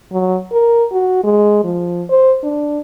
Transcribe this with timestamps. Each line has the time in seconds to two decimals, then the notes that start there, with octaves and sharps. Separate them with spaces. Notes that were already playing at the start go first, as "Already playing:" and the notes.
0.12 F#3
0.52 A#4
0.92 F#4
1.24 G#3
1.64 F3
2.09 C5
2.43 D4